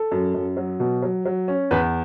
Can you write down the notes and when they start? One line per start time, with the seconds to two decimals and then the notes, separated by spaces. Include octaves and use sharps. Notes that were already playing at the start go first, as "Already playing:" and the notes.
Already playing: A4
0.11 F#2
0.34 F#2
0.57 F#3
0.80 B2
1.02 F#3
1.26 F#3
1.48 C#4
1.71 E2 B4